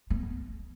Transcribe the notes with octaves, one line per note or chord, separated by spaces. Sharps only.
B3